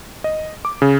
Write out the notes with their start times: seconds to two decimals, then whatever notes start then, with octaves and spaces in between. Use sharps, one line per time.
0.24 D#5
0.65 D6
0.82 C#3